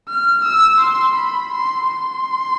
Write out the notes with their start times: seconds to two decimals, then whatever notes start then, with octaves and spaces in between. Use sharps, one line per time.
0.09 F6
0.45 E6
0.80 C6
1.15 B5
1.52 C6
1.88 C6